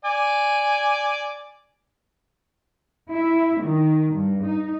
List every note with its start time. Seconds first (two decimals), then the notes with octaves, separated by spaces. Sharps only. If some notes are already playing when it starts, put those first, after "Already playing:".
0.05 D5 G#5
3.09 E4
3.61 D#3
4.13 G2
4.44 D#4